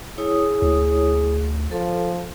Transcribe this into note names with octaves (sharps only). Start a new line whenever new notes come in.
E4 G#4 C#5 D#6
D2
F3 A4